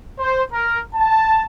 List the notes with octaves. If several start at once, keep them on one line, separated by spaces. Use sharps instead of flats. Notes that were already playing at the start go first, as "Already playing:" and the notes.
C5
A#4
A5